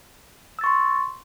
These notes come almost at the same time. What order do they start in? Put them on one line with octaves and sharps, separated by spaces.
E6 A6 C#6 C6